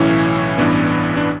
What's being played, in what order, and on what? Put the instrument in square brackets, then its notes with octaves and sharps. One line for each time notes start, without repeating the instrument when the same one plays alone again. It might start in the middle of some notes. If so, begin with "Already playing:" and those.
Already playing: [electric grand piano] B1 A2 E3 C#4 E4
A1 G2 E3 B3 D4
D4